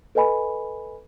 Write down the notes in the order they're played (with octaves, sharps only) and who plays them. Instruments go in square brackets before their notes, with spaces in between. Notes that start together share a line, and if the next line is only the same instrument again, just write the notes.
[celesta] A4 B4 D#5 G#5 B5